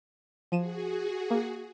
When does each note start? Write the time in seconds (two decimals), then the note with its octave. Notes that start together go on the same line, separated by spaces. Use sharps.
0.52 F3 F#4 G#4 D#7 E7
1.31 A#3